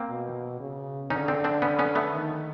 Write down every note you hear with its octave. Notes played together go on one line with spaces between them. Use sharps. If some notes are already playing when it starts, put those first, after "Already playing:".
Already playing: A#3 C4
B2
C#3
D3 C#4 D#4
C4 D4
C4 D4
B3 C#4
B3 C#4
A3 B3
D#3